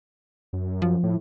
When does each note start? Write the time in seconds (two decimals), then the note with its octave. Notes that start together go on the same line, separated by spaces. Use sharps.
0.53 F#2
0.82 F#2 F3
1.03 A2